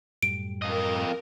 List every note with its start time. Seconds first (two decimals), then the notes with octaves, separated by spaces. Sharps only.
0.23 F#2 A2 G3 D7
0.62 F2 A#4 D#5